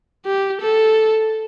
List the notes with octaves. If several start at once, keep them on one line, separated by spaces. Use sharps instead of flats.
G4
A4